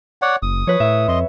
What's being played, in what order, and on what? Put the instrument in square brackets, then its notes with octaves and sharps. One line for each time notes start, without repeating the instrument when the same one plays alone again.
[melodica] C#5 D5 F#5
[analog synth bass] F#1 [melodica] D#6
[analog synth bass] F3 [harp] B4 C#5
[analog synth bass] A2 [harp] E5
[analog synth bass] F2 [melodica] D#5 C6